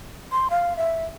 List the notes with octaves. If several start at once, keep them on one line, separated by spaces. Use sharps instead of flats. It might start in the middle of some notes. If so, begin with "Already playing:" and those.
C6
F5
E5